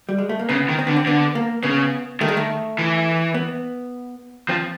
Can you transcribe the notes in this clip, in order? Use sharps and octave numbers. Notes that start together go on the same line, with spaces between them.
G3
G#3
A3
A#3
C#3 B3
D#3
C4
D3 B3
C4
D3 B3
A#3
C#3 B3
D#3 A3
G#3
A3
E3
B3
F3 C4